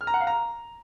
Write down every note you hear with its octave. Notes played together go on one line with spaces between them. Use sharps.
F6
A#5
F#5
F5
A#5